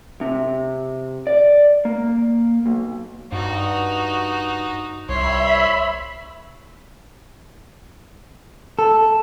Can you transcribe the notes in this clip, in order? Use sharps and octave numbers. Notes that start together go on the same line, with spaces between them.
C3
D5
A#3
B1
G2 D#4 F#4
C2 C#5 E5 B5 C6
A4